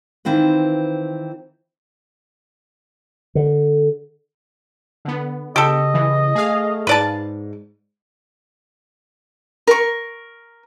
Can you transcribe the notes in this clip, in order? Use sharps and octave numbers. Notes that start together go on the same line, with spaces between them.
D#3 E3 C4 F4 B4
D3
D3 B3
C#3 G4 A4 D#5
E3
A3 G#4 F5
G#2 B4 D5 A5
A#4 C#6